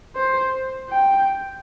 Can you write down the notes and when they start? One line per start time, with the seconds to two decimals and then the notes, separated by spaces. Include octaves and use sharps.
0.16 C5
0.90 G5